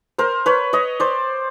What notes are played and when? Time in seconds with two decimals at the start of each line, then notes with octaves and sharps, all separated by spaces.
0.18 A#4 C5
0.46 B4 C#5
0.73 C#5 D#5
1.00 C5 D5